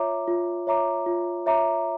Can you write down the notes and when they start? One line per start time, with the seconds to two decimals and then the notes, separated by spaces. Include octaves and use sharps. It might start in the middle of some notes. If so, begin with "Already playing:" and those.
Already playing: F4 C#5 E5 A#5 D6
0.28 F4
0.67 C#5 E5 A#5 D6
1.06 F4
1.46 C#5 E5 A#5 D6